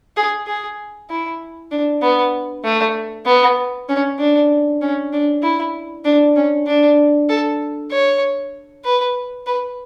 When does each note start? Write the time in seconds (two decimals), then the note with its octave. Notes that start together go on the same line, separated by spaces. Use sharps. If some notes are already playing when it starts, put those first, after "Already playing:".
0.17 G#4
0.47 G#4
1.10 E4
1.71 D4
2.02 B3
2.64 A3
3.26 B3
3.89 C#4
4.19 D4
4.81 C#4
5.12 D4
5.43 E4
6.05 D4
6.36 C#4
6.67 D4
7.29 A4
7.92 C#5
8.84 B4
9.46 B4